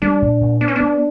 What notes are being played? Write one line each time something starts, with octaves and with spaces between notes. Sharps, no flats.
G3 D4
A#2
A#2
B3 D4
C#4
B3 D4